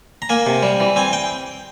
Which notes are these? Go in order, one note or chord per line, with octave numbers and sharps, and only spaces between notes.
A#5
A#3 G#5
C3
G3
E3
C4 G#5
G5